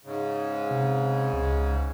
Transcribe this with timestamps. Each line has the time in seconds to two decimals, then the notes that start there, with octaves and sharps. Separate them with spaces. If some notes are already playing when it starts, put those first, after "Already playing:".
0.04 G#2 C#3
0.71 C3
1.33 C#2